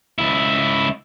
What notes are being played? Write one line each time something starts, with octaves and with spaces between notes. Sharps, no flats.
C#2 E4